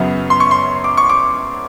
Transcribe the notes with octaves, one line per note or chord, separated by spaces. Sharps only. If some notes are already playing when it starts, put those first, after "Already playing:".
Already playing: F#2 C#3 F#3 B3
C6
C#6
C6
D6
C#6
D6